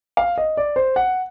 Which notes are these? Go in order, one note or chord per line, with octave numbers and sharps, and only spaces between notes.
F5
D#5
D5
C5
F#5